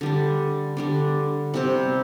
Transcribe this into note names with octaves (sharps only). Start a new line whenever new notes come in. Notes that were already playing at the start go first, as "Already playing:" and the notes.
D3 G3 D4
D3 G3 D4
C3 G3 C4